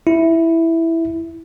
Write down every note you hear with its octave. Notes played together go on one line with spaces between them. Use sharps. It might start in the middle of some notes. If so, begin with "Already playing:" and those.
E4